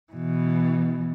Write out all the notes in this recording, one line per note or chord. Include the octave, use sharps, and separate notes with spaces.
B2 E3